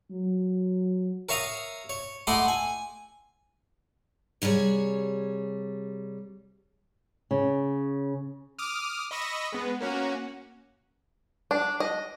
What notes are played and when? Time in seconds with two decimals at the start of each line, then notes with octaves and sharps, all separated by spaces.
0.11 F#3
1.29 A#4 C#5 E5 F5 A#5 D#6
1.89 C#5
2.27 A3 E4 D#5 F#5 C6 D6
2.48 G#5
4.42 C3 G3 G#4 C#5
7.31 C#3
8.59 D6 D#6 F6
9.11 D#5 B5 C#6 E6 A#6
9.53 G#3 B3
9.80 A#3 C#4 F#4
11.51 D4
11.80 D#5